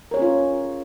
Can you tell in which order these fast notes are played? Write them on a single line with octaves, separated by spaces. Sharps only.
A#4 C#5 G#4 C#4 F4